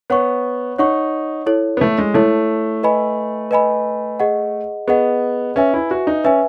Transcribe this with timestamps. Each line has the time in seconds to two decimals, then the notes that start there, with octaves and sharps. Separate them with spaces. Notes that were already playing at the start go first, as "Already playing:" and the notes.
0.10 B3 C#5 F#5 C#6
0.79 D#4 C#5 F#5 C#6
1.46 E4 A4 C#5
1.77 B3
1.81 A3
1.98 G#3
2.14 A3 E4 A4 C#5
2.83 B4 D#5 G#5 B5
3.51 B4 D#5 G#5 B5
4.20 G#4 D#5 F#5
4.88 B3 G#4 D#5 F#5
5.56 C#4 B4 E5 G#5
5.74 E4
5.91 F#4
6.07 D#4
6.24 C#4 B4 E5 G#5